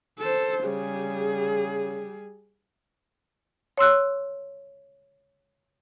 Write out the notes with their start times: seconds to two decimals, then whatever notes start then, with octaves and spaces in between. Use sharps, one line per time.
0.19 A4 C5
0.64 C#3 G3 G#4
3.78 C#5 C6 E6 F#6